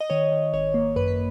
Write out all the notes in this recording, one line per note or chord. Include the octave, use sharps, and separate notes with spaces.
D#5
D#3 C#5
D#3
G#1 C#5
A#3
F#2 B4
B4